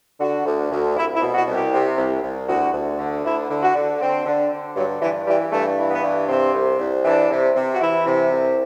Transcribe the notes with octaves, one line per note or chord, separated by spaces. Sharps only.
D3 F#4
D2
D2
C2 E4
E4
B2
F#4
C2
G4
C3
C2
C2
D2 F#4
D2
D3
D2 E4
D3
F#4
D3
D3 C4
D3
D3
G2 F#3
G2 E3
E3 G3
G2 A3
E3
B3
G2
C3 C4
C2
C2
E3 D4
C3
C3
F#4
E3 E4
C3
C2